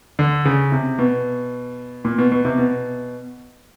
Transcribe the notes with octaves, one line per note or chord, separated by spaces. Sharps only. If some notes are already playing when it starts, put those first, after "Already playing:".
D3
C#3
C3
B2
A#2
B2
B2
C3
B2